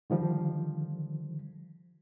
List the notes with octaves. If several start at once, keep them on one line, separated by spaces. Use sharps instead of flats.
D3 D#3 F3 G3